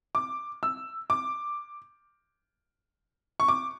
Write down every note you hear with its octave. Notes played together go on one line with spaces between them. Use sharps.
D6
E6
D6
C#6
D6